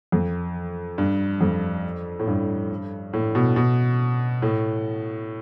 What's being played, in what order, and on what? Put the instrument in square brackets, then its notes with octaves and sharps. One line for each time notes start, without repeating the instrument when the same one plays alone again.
[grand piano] F2
G2
F2
A2
G2
A2
B2
B2
A2